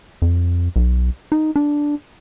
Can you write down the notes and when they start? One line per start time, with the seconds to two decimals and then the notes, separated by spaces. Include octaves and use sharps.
0.22 F2
0.76 B1
1.32 D#4
1.56 D4